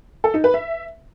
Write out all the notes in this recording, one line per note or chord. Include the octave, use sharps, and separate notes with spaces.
A4
D#4
B4
E5